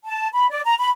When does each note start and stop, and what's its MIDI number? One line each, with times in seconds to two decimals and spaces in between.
0.05 0.28 81
0.33 0.47 83
0.51 0.60 74
0.65 0.75 82
0.78 0.89 83